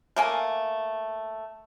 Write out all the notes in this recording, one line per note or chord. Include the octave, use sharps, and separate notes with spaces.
A3 A#3 G#5